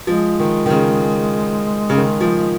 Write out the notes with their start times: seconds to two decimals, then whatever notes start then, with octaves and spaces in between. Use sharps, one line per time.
0.07 F3 G#3
0.39 D#3
0.66 D#3
0.70 C#3
1.90 C#3
1.97 D#3
2.21 F3